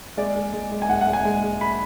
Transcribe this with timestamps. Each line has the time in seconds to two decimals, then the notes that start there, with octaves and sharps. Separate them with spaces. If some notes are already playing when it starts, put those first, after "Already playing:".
0.17 G#3 D5
0.36 G#3
0.53 G#3
0.71 G#3
0.82 G#5
0.89 G#2 F#5
1.01 F#5
1.07 G#3
1.13 G#5
1.25 G#3
1.43 G#3
1.61 B5